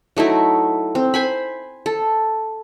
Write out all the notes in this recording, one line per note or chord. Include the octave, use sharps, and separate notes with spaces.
F#3 A3 D#4 E4
C4
C5 G#5 B5
A4